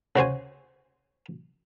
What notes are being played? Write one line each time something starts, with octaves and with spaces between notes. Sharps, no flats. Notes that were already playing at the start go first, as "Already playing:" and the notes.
C#3 F#4 C5 G#5